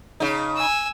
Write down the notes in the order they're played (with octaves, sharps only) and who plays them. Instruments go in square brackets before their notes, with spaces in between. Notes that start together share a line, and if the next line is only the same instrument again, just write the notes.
[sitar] C#3 D#4
[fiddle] G#5 E6